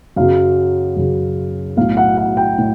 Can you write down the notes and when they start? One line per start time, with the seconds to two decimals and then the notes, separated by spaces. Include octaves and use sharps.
0.16 F#2 C#3 F#3 F5
0.97 F#2 C#3 F#3
1.77 B1 A2 F#3 F5
1.97 F#5
2.17 F#5
2.37 G5
2.59 A2